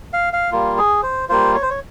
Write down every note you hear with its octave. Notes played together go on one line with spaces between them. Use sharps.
F5
F5
G3 A#3 F4
G#4
C5
G3 A#3 F4 C5
C#5
C5
C#5